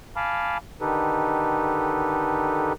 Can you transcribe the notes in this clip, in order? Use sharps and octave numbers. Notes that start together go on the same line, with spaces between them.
F5 G#5 A5 B5 D6 F6
D3 D#3 D#4 G4 A4 B4